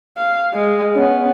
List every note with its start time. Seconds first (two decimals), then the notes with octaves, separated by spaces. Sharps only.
0.17 F5
0.54 G#3
0.96 B3 C#4